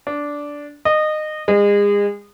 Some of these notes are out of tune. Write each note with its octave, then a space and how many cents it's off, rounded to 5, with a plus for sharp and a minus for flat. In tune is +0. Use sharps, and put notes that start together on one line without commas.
D4 -10
D#5 -20
G#3 -35